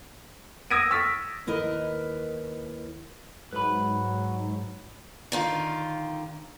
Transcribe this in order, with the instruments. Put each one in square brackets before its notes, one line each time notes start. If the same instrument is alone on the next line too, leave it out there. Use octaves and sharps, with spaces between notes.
[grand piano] D#6 E6 G#6 A#6 D7 D#7
C#6 E6 F6 A6 B6
[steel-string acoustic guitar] D#2 E4 A#4 B4 D#5
[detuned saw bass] G#2 [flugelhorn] F#3 [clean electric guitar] B4 B5
[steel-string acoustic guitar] D3 D#3 F4